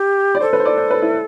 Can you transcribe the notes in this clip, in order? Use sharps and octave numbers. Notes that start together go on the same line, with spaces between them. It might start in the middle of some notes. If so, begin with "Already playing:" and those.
Already playing: G4
D5
A4 C5
B4
C5
D5
C5
B4
E4